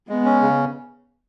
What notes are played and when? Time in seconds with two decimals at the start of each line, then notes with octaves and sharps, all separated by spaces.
0.09 G#3 B3
0.25 C#4
0.42 C#3